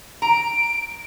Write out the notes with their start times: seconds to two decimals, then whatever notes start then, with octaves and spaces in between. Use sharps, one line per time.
0.22 A#5 D7